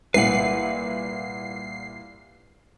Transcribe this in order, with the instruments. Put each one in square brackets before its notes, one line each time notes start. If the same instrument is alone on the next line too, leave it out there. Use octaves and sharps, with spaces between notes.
[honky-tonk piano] C2 A#2 C#7 [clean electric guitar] B4 F#5 [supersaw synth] C7